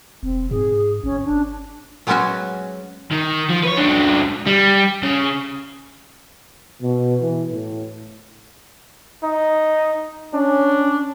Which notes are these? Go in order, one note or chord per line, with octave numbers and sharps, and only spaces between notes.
E1 C4
G#2 G#4
G1 C#4
D4
F#3 G#3 B3 C#4 F#4 G#5
D#3
F3
B4 C#5
C#2 D4
G3
C#3
B2
E3
A2
D#4
C#4 D4